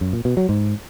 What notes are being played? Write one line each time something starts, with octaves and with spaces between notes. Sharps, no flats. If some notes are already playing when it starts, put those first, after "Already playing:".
F#2
A#2
B2
F#3
G#2